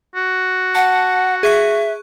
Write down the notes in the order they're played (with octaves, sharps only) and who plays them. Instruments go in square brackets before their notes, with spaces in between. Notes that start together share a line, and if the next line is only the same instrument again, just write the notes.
[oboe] F#4
[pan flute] F#5 [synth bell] A5
[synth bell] G#4 C#6 F#6 [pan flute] E5